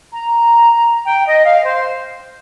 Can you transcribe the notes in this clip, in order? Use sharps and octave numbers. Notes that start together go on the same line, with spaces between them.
A#5
G5
D#5
F5
C5